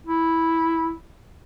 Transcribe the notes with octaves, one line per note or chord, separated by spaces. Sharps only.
E4